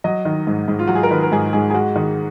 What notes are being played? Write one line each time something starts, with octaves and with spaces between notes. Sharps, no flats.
F#3 D#5
D#3
G#2
G#2
F4
F#3 F#4
G#4
A#4
D#3 B4
A#4
G#2 G#4
G#2 G#4
G#4
G#3 F#4
D#3